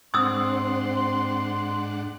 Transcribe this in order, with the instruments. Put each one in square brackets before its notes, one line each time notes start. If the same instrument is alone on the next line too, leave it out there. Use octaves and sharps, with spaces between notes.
[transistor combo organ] G#2 D4 F#5 [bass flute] C4 [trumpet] C6 [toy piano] D#6 E6